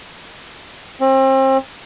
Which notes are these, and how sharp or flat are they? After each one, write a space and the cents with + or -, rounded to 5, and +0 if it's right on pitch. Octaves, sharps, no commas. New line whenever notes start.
C4 +35